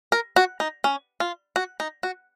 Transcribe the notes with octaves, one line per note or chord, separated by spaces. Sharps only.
A#4
F#4
D#4
C#4
F4
F#4
D#4
F#4